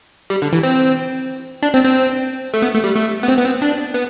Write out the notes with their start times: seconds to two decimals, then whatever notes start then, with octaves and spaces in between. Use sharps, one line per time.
0.30 G3
0.42 D3
0.53 E3
0.63 C4
1.63 D4
1.74 C4
1.85 C4
2.54 A3
2.62 B3
2.74 A3
2.84 G3
2.96 A3
3.23 B3
3.28 C4
3.38 B3
3.45 C4
3.62 D4
3.94 B3